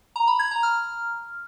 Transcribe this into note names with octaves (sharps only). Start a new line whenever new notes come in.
A#5
B5
G#6
A#5
F6